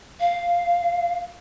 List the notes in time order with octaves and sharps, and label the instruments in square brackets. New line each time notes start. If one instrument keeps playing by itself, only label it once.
[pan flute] F5